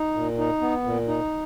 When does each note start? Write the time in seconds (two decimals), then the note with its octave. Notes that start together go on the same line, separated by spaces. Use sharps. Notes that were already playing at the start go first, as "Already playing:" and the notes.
Already playing: D#4
0.14 A#2
0.38 D#4
0.61 B3
0.84 A#2
1.08 D#4